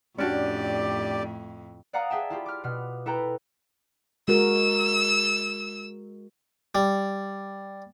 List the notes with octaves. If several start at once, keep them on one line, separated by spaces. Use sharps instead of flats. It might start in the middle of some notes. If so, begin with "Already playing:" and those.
F2 A2 C#4 D4 F#4 G4 D5
D5 F5 F#5 A#5 D#6
G#4 E5 G5 A5
E4 F4 G4
D6 F6
B2 B3 F6
E4 A4 B4 G5 A#5
G#3 F#4 A#4 E6
G3